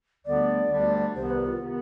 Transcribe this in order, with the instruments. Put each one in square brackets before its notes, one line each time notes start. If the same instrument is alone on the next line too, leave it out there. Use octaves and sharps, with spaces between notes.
[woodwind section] D2 D3 G3 B3 D4 [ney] D5
[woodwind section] D2 D3 G3 B3 D4
[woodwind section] C2 C3 D#3 B3 [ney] C5
[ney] B4
F4
[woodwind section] C3 D#3 B3